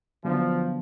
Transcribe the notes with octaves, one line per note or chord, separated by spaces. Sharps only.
D3 F3 F#3 B3 D4